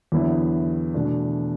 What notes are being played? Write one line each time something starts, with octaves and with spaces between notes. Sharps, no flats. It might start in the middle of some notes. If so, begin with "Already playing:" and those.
E2 D3 F#3 B3 E4
E2 B2 A3 D4